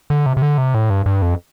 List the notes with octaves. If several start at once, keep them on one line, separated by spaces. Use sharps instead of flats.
D3
C3
C3
D3
C3
A2
G2
G2
F2